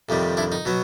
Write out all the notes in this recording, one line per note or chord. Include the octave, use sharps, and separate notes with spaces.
F2 C3 D#3 G3
D4 E4
D#4
B2 F#3 B3